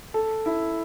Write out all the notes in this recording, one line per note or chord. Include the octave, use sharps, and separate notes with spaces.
A4
E4